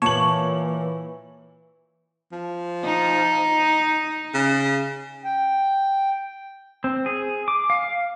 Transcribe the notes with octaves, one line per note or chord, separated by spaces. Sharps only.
A#2 E3 C#5 A5 F#7
F3
D#4
C#3
G5
C4
G#4
D6
F5